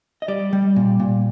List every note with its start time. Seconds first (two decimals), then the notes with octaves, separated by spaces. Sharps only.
0.22 D#5
0.28 G3 D5
0.53 G3
0.76 A#2
1.00 A#2